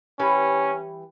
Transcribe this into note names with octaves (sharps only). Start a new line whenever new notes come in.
E3 G3 C#4 B4